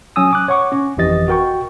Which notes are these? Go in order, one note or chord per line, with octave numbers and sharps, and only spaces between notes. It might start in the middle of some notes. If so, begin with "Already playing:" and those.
F#3 C#4 G#5 D#6 E6
D6 F#6
C#5 F#5 C#6 D6
C#4
G1 F2 E3 G4 D#5 A6
F#4 A#4 G5 C#6